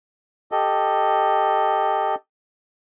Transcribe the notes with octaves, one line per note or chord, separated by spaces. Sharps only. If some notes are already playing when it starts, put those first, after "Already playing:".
G4 A4 D#5